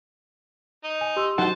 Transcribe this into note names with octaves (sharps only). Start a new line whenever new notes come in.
D#4
G#5
G4 C6 E6
F#3 D#4 C5 F#5 A5